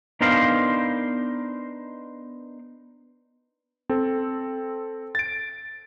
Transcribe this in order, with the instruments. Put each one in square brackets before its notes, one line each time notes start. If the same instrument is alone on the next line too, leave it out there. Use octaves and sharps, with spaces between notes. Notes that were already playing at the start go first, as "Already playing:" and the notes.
[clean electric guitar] B3 D4 D#4 A#4 C5 F5
[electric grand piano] C4 A4
A6 D7